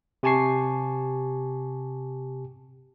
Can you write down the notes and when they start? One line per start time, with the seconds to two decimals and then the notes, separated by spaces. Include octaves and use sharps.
0.23 C3 G4 G#5 A5 C#6 C7